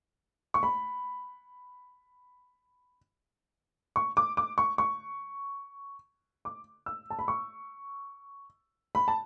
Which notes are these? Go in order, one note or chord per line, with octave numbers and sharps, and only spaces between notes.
C#6
B5
C#6
D6
D6
C#6
C#6
D6
E6
A5
B5
C#6
B5
A5